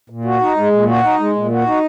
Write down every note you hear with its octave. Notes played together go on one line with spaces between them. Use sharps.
A#2
F#4
D#4
G#3
A#2
F#4
D#4
G#3
A#2
F#4
D#4